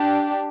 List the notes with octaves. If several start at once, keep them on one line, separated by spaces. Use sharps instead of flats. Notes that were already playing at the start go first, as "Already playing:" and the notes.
Already playing: D4 G4